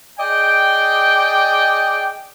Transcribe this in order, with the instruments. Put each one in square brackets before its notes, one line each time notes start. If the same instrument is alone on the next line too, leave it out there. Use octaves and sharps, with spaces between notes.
[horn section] G#4 D5 D#5 G5